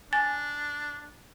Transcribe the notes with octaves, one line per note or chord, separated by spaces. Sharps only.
D4 G#5 A6